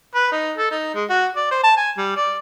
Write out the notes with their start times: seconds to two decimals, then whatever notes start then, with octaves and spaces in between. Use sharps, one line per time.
0.15 B4
0.32 D#4
0.57 A4
0.71 D#4
0.95 G#3
1.10 F#4
1.36 D5
1.51 C5
1.64 A5
1.77 G#5
1.98 G3
2.17 D5